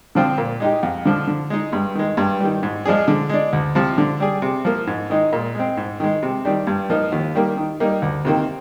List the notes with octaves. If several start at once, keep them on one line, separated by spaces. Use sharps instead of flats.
D3 F3 C4 F4
A#2
G#3 D#4 G4
F2
D3 F3
D3
G#3 D#4
G2
D#3 G#3
G2
D#3 G3
G#2
F3 G#3 D4 G#4
D3
G#3 D4
D2
C3 F3
D3
G3 D4 G#4
C3
F3 A#3
G#2
D#3 G#3 D#4
A#2
G#3 C4
G#2
D#3 G#3
C3
D#3 G3 D4 G4
G2
F3 A#3 D#4
D#2
D#3 G3 A#3
D#3
G3 A#3 D#4
D2
C3 D#3 A#3